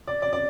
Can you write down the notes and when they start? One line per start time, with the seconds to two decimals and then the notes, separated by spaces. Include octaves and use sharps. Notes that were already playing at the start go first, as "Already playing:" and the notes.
0.08 D5
0.22 D5
0.33 D5